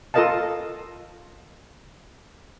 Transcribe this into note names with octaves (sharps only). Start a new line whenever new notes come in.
F4 A4 A#4 D#5 F5 A5